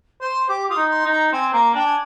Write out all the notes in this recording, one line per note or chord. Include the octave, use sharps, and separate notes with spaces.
C5 C6
G4 D6
F4 D#6
D#4
C6
D#4
A#5
C4 G#5
A#3 A#5
D4 G5
G#5